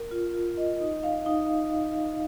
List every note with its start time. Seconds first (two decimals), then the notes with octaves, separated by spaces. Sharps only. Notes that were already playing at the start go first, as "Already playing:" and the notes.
Already playing: A#4
0.11 F4
0.34 F4
0.57 D#5
0.80 D#4
1.03 F5
1.26 D#4